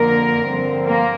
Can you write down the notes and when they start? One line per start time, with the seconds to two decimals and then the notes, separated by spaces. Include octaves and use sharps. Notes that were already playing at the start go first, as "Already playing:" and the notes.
Already playing: F2 D3 A#3 A#4
0.47 G2 D3 F3 C4
0.86 A#3 A#4